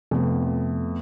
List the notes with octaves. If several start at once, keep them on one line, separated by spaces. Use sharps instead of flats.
F2 C3 A3 B3